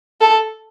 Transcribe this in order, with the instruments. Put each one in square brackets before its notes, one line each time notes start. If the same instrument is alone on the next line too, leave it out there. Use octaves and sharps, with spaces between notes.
[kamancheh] A4